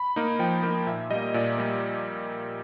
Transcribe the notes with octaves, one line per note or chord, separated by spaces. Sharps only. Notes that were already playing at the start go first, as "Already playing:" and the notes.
Already playing: B5
A#3 D#4
F3 G5
A#3 D#4
A#2 E5
G3 A#3 D#5
A#2 D5
G3 A#3